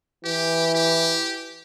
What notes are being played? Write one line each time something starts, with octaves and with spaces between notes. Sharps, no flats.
E3 G4
G4